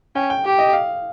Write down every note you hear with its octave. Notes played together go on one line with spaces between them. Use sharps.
C#4 G5
G5
G4
D#5
F5